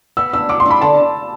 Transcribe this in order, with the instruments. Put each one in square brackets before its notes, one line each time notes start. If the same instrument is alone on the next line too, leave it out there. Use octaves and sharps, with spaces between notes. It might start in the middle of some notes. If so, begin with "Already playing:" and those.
[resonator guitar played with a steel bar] B3 [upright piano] E6
[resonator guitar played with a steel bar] D4 [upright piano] E6
[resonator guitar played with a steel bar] F#3 [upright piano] D6
[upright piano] C6
[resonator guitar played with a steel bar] D4
[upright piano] B5
[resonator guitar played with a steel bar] D3 [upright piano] A5